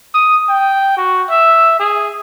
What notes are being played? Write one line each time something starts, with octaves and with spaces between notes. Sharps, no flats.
D#6
G5
F#4
E5
G#4